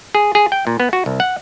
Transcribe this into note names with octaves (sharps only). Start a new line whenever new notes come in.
G#4
G#4
G5
A#2
B3
F#4
C2
F#5